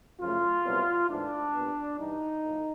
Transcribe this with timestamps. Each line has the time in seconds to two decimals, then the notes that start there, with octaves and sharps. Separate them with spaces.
0.19 F#2 C#3 F3 A3 F4
0.64 C2 A#2 F#3 B3
1.08 G#2 E3 A3 D4
1.54 A#2 G3 B3
1.99 G2 E3 G3 D#4
2.43 A2 F3 A3